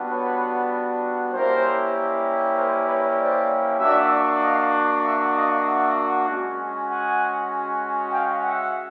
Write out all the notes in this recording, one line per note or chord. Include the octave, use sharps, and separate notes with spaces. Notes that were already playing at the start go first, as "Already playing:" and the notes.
Already playing: G3 B3 D4 F#4
B4 C#5
G3 A#3 C#4 E4 G4 A#4 C5
A#4 C5
B4 C#5
C5 D5
A#3 D4 F#4 D5 E5
D#5 F5
E5 F#5
D#5 F5
E5 F#5
G#3 C#4 F#4
F#5 G#5
F5 G5
E5 F#5